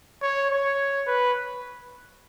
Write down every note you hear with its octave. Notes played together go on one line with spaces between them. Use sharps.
C#5
C#5
B4